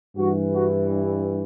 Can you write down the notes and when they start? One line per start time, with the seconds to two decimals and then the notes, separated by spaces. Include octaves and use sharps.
0.16 G2 E3 F#4
0.54 F#4